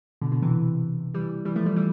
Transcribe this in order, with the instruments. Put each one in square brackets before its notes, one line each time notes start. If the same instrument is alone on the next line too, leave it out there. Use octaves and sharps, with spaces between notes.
[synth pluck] B2 D3
B2 D3
C3 E3
E3 G3
E3 G3
F3 A3
E3 G3
E3 G3